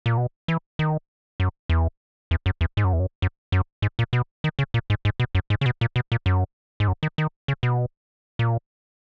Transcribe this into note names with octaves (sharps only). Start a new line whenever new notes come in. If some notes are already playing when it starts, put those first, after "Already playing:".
A#2
B2
E3
D#3
F#2
E2
E2
F#2
E2
G#2
F#2
E2
F#2
F#2
F#2
G#2
A#2
B2
D#3
C#3
A#2
G#2
G#2
B2
F#2
G#2
C#3
B2
A#2
B2
A#2
F#2
G#2
F#2
D#3
D#3
C#3
B2
A#2